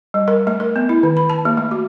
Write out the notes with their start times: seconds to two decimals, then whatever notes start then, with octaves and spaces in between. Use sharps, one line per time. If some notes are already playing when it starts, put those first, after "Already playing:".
0.14 G3
0.28 A#4
0.47 A3
0.60 A#4
0.76 B3
0.89 E4
1.03 D#3
1.17 B5
1.30 A5
1.45 A#3
1.57 A3
1.71 F#4